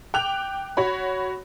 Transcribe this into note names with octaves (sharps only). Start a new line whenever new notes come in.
G5 D6 F#6 F7
F#4 C#5 B5